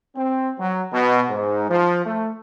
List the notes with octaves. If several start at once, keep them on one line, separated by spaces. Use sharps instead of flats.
C4
F#3
B2
G#2
F3
A3